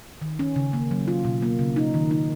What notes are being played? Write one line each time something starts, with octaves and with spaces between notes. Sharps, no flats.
D#3
C#4
C#3
A#3
F#3
F4
B2
A#3
C#3
D#4
D#3
D#4